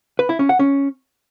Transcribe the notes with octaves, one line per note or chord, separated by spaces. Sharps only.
B4
E4
C#4
F#5
C#4